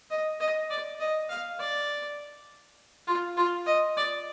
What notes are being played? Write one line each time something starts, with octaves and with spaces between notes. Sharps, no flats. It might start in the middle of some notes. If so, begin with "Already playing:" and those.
D#5
D#5
D5
D#5
F5
D5
F4
F4
D#5
D5